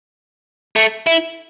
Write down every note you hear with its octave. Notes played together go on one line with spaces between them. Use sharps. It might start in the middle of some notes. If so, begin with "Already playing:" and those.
A3
E4